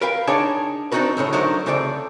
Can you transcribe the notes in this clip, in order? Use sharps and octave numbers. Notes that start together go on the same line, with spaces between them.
A#4 B4 F5 G5
D4 D#4 G#4 C#5 G5 A5
C4 D4 D#4 F#4 A#4 B4
D2 A2 C#3 C#5
F#3 A3 D4 D#4 A#4 C5
C2 C#3 A3 C5 D5 G5